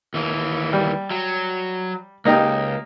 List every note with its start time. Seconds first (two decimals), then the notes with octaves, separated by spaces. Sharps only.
0.14 D#2 E3
0.73 G3
1.11 F#3
2.25 C#2 A#3 D#4 G4